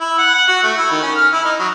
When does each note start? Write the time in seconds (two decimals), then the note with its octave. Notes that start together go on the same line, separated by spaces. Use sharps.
0.01 E4
0.19 F#5
0.34 F#5
0.48 F#4
0.63 A3
0.78 E4
0.91 D#3
1.03 C#4
1.15 F6
1.32 E4
1.45 D#4
1.60 F#3